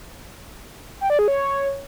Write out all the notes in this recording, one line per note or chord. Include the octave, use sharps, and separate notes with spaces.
G5
D5
G#4
C#5